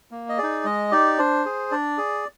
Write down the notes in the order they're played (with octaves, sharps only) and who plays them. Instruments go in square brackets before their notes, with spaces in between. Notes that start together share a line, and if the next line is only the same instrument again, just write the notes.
[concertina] A#3
D#5
G#4 D5
D#4
G#3 D#5
D#4 G4 D5
D4 C5
G#4
D4 D5
G#4